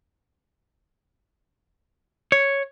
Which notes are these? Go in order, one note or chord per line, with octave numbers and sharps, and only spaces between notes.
C#5